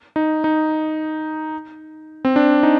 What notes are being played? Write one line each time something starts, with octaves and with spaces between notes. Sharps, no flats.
D#4
D#4
C4
D4
D#4